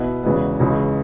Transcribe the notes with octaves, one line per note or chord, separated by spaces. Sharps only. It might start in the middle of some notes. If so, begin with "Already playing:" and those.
Already playing: B2 B3 E4
E2 C#3 E3 G#3 B3
C#2 C#3 E3 G#3